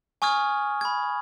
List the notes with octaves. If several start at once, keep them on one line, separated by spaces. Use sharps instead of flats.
G#5 C#6 D#6 F6 G#6
B5 G#6